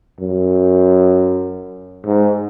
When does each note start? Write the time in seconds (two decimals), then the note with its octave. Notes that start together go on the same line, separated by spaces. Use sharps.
0.20 F#2
2.06 G#2